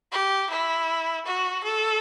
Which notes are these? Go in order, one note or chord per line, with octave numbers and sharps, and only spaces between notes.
G4
E4
F#4
A4